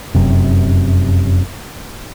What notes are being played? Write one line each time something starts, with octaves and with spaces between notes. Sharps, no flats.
F1 F#2 C3